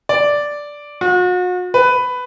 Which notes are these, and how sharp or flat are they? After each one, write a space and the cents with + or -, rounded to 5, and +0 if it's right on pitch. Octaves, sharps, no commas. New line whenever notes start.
D5 -5
F#4 -40
B4 +10